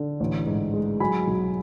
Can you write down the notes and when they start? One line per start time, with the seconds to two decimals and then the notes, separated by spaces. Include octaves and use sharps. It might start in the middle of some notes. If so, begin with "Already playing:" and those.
Already playing: D3
0.20 A1
0.46 G#2
0.74 G#3
1.00 F#3 G#5 B5
1.27 B1